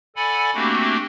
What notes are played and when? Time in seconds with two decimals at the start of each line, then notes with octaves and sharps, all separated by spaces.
0.16 A4 D5 F#5 G#5 B5
0.54 A3 A#3 C4 D4 F#4 G4